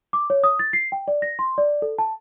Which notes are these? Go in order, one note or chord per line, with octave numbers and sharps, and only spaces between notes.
D6
C#5
D#6
A6
C7
G5
D5
A#6
C6
D5
A4
A5